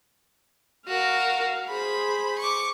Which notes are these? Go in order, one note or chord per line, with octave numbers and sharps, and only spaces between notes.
F#4 A#4 F5
G#4 C5 B5
C#6 D6